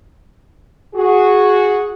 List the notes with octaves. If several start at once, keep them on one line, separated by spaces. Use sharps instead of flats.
F#4 G#4